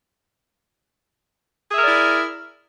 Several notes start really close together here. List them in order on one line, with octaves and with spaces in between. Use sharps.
G#4 E5 A#4 D5 E4